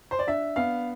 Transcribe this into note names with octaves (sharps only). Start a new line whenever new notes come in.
C5
D5
D4 E5
B3 F5